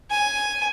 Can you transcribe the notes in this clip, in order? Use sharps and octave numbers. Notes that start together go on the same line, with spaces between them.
G#5